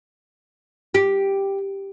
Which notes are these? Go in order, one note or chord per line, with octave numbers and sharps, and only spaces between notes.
G4